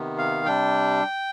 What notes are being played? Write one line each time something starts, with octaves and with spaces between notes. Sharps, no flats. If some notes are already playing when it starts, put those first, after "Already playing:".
Already playing: C3 D#3 B3
F5
C3 G3 D4 G5